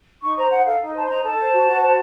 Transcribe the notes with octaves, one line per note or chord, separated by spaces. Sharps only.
D#4 C#6
C5 A#5
D#4 F#5
A4 F5
D#4
C5 A5
C6
D#4 A#5
A4 A5
C5
F#4
F#4
C5